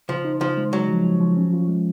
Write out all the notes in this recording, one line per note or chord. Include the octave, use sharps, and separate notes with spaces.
C#3 F3
D#4
C#3 F3
G#3
F#3 G#3
F3
F3
F3
C#4
F4
G#3